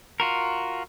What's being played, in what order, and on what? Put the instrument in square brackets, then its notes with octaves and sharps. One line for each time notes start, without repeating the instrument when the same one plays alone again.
[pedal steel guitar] F4 F#4 A#4